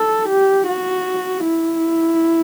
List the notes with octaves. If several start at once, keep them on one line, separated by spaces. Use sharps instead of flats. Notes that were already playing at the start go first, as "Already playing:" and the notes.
Already playing: A4
G4
F#4
E4